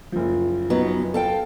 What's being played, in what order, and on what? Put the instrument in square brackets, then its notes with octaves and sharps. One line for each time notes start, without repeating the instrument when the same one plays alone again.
[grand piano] F#1 F3
[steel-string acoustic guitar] F#3 B3 D#4
A4 F5 G5